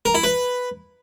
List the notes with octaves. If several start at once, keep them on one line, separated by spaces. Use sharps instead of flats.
A#4
E4
B4